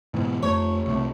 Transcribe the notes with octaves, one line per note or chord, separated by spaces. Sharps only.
G#2 B2 E3
F2 A3 C#5
C2 C3 A3